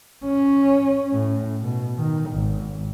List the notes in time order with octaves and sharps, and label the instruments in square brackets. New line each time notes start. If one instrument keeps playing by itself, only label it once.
[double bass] C#4
A2
B2
D#3
G#1